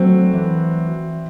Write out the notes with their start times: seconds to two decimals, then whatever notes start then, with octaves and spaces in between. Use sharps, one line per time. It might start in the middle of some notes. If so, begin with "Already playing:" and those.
Already playing: F#3 A3 C4
0.33 E3